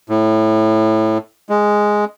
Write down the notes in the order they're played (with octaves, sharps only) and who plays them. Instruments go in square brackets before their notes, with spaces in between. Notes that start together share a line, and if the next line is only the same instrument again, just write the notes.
[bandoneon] A2
G#3